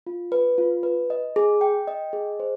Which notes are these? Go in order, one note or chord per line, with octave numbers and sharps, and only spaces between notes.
F4
B4
F4
B4
D#5
G#4
G5
D#5
G#4
C5